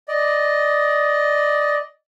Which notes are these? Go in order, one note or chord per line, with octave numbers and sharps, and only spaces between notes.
D5 D#5